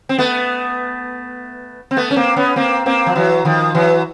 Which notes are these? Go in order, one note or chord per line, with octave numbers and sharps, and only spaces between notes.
C4
A3 B3
C4
A3 B3
C#4
A#3 C4
B3 C#4
A#3 C4
A#3 C4
F3
E3 F#3
D#3 F3
E3 F#3